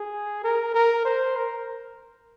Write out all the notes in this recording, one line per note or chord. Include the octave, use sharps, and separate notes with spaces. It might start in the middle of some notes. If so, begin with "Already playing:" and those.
Already playing: G#4
A#4
A#4
C5
A#4